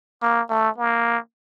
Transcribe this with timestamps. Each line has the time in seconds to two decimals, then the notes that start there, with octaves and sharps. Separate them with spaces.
0.22 A#3
0.50 A3
0.78 A#3